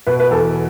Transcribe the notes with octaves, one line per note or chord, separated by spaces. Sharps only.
B2 B4
B4
E2 A4